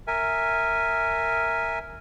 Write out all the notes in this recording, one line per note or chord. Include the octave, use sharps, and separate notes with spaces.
A#4 E5 G#5